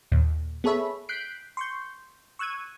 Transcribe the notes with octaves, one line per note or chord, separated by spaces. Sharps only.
D#2 A#2
B3 G#4 A4 C#5 E5 B5
F#6 G6 B6 C7 D7
C6 C#6 G6
C#6 E6 F#6 G#6 D#7